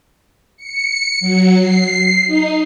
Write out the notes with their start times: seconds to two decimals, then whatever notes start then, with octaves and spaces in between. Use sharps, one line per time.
0.57 C#7
1.20 F#3
1.56 C7
2.27 D#4